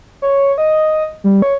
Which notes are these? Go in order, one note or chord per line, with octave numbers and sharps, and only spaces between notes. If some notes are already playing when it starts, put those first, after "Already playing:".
C#5
D#5
G3
C#5